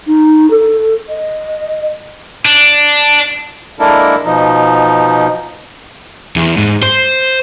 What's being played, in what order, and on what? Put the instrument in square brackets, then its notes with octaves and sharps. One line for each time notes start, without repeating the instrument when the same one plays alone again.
[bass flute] D#4
A4
D#5
[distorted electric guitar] D4
[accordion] G#3 A#3 D4 E4 A4 A#4
B2 F3 D#4
[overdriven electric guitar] E2
G#2
C5